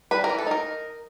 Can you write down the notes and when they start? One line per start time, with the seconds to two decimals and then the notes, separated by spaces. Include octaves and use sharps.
0.11 G3 B4
0.24 A#4
0.29 E3
0.38 A4
0.46 D#4 A#4